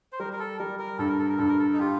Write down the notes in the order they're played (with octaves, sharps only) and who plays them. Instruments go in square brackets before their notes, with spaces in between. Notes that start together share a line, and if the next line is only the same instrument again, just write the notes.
[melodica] C5
[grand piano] G3 [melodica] A#4
[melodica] A#4
A4
[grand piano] G3 [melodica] A#4
[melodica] A#4
[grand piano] G2 [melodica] A4
[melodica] A#4
A4
A#4
[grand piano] G2 [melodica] A4
[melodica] A#4
A4
D#4
[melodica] F4 [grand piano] G4